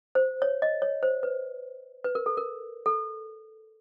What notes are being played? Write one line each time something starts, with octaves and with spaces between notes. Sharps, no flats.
C5
C#5
D#5
C#5
C5
B4
B4
A#4
A4
A#4
A4